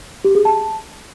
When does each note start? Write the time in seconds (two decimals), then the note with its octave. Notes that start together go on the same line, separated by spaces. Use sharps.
0.25 G4
0.35 G#4
0.45 A5